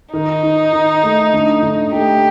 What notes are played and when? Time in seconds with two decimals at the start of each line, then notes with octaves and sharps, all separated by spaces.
0.13 D#3 D#4
0.43 D#3
0.73 D#3
1.03 A3
1.33 D3
1.63 D3
1.92 A3 G4